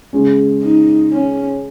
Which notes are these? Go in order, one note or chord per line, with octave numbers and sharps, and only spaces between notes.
C#3 G#3 C#4
D#4
C#4